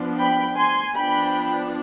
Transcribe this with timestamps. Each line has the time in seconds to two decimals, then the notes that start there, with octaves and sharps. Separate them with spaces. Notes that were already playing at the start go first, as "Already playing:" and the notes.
Already playing: F3 B3 D4
0.17 G5 B5
0.57 G#5 C6
0.96 F3 B3 D4 G5 B5